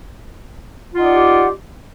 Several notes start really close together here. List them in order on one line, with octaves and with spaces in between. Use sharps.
F4 F#5 D#4 D5 G4